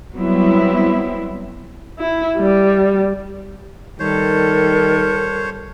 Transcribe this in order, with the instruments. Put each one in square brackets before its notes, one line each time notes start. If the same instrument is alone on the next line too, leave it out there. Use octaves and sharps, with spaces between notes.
[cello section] F#3 G3 B3 C4 E4
[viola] E4
G3
[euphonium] D#3 [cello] G3 A4 [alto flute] A#4 [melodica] C5 C#5